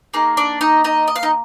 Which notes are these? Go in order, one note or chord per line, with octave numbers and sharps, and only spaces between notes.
A#3 D#4 G#4
D4 D5
D#4 D#5
D#4 D#5
D#5
F5
D#4 D#5